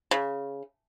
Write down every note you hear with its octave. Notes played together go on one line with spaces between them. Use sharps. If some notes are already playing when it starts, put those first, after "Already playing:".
C#3